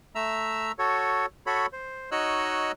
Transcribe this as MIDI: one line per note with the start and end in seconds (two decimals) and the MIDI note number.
0.15 0.72 57
0.15 0.72 76
0.15 0.72 82
0.15 0.72 88
0.79 1.26 66
0.79 1.26 69
0.79 1.26 73
1.46 1.66 66
1.46 1.66 69
1.46 1.66 73
1.46 1.66 83
1.73 2.10 72
2.11 2.72 63
2.11 2.72 66
2.11 2.72 73
2.11 2.72 75
2.11 2.72 88
2.11 2.72 90